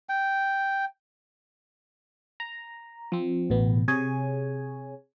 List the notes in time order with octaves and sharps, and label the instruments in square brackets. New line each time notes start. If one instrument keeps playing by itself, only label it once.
[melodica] G5
[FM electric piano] A#5
F3 C4
A1 B2 B3
C3 G#4 C#5 G#5